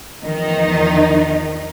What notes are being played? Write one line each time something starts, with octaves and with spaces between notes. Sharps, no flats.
E2 D#3 F3 D#4